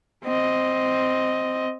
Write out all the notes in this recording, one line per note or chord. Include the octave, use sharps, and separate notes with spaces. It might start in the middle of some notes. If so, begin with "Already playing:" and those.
C4 D#5